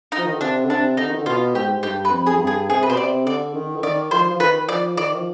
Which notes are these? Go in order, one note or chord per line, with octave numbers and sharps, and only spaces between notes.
D#4
F3
D#3
D3
C3 D4
D3
C3 D4
D3 D#4
D#3
D3
B2 F4
G#2 G4
G#2
G2 G4
B4
F2
G#4
F2
G2
G#4
C3 G#4
B4
B2 C5
C3 D5
D3 D5
D#3
D3
D#3 D5
F3 C5
F3
D#3 B4
F3 D5
D#3 D5
F3